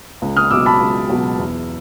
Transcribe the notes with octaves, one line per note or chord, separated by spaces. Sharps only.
C#2
D#6 F6
B2 F#3 D6 E6
A5 B5
C#2
B2 F#3
E2